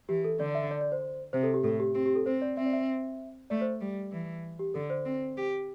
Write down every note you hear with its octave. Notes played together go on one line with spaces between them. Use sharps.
E3 G4
A4
D3 D5
E5
D5
D5
C5
C3 C5
A4
G4
A2 A4
G4
C4 G4
G4
A4
C4 C5
D5
C4 E5
D5
E5
A3 D5
C5
G3
E3
G4
D3 A4
C5
C4
G4